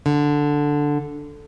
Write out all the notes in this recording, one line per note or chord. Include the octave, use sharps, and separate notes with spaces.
D3